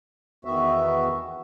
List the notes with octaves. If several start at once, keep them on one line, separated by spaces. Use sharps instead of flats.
E2 D#3 B3 F#4 E5